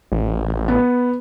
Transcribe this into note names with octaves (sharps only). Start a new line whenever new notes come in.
A1
B3